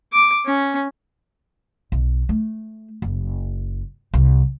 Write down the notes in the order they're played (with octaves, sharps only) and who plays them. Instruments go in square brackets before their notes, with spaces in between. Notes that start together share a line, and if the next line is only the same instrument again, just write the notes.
[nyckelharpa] D6
C#4
[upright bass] B1
A3
F#1
C2